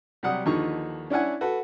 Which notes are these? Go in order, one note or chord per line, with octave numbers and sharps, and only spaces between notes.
C3 F#3 G3 F#5 D#6
D#2 D3 E3 F3 D#4 C#6
C#4 D4 E4 F#5 G#5
F#4 A4 B4